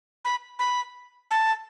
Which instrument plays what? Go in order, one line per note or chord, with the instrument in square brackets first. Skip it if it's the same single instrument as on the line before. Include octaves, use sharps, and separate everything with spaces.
[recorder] B5
B5
A5